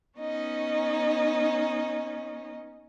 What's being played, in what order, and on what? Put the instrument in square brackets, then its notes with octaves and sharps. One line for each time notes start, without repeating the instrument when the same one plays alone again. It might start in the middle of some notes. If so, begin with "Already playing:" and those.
[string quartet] B3 C#4 D#4 D#5